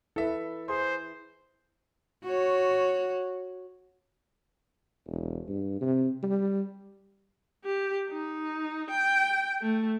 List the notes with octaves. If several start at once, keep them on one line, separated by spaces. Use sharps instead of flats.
E4 A4 B4 E5
G#4 C5 C6
F#4 C#5
E1
G2
C3
G3
G4
D#4
G5
A3